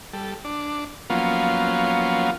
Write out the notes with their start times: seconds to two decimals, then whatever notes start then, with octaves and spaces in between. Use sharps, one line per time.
0.13 G3 A4
0.45 D4
1.10 F3 F#3 A#3 B3 C#4 F4